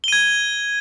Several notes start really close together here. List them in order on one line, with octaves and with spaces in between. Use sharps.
G7 D#7 G#6